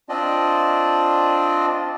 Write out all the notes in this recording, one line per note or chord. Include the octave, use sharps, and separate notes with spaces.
C4 D4 F4 D5 D#5